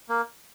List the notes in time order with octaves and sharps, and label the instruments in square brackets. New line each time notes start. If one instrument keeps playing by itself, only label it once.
[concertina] A#3